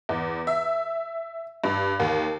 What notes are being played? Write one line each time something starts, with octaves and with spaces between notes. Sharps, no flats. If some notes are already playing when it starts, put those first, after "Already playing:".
E2
E5
G2
D#2